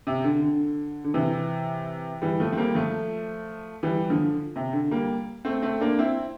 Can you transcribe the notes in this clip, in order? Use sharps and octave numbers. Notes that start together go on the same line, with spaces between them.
C3
D3
D3
D3
C3 E3
E3 G3
F3 A3
C4
G3 A#3
F3 A3
E3 G3
D3 F3
C3
D3
G3 A#3
A3 C4
A3 C4
A#3 D4
C4 E4